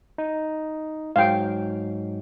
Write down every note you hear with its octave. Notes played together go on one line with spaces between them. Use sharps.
D#4
G#2 F#3 F5 G5